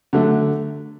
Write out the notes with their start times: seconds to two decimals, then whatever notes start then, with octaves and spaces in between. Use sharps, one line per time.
0.13 D3 F#3 A3